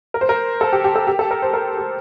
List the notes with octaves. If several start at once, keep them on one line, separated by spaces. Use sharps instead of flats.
A#4
C5
A#4
A4
G4
G4
A4
G4
A4
A#4
C5
A#4
G4